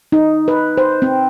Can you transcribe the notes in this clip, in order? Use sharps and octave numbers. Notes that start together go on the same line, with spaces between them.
D#4
B4
C5
C4